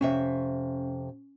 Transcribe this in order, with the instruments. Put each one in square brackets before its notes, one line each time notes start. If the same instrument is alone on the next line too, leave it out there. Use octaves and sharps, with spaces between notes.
[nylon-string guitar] F2 C3 E5 [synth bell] C#4